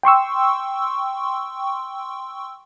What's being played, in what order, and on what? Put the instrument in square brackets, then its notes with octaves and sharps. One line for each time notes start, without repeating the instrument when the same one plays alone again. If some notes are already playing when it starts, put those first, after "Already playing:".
[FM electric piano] G5 C6 C#6 E6